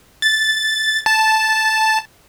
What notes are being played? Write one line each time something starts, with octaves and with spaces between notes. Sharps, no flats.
A6
A5